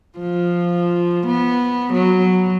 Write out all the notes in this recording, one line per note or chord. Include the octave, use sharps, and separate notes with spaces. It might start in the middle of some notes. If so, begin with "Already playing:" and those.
F3
B3
F#3